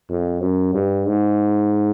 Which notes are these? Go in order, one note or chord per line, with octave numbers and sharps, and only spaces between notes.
F2
F#2
G2
G#2